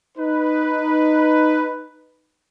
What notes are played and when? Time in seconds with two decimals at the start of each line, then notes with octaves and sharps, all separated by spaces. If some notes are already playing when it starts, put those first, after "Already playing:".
0.17 D#4 B4